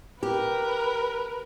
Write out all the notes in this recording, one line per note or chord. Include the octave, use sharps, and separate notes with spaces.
G4 A#4 B4